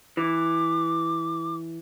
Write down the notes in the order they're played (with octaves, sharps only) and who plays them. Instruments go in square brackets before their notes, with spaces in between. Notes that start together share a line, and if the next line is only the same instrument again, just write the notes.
[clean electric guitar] E3 [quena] D6